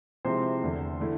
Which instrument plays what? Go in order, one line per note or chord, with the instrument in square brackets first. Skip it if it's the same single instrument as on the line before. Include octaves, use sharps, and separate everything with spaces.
[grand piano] C3 F3 G#3 C4 E4 C5
E2 D3 A3
D3 A3 E4